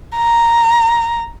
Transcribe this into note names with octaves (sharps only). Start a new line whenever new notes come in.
A#5